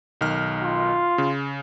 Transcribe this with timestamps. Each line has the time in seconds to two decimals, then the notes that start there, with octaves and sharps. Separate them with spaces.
0.21 B1 D#3 F6
0.62 F4
1.18 C#3